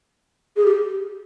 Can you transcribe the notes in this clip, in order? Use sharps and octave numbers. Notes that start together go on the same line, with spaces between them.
G#4
G4